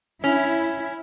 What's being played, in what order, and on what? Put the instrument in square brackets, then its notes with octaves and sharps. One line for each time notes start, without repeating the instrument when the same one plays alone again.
[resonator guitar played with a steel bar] C#4 [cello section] E4